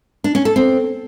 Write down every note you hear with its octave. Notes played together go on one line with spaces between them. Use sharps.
D4
C#4
A4
C4